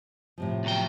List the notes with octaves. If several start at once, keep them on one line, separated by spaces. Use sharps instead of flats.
A2 C3 F3
E2 F#3 G5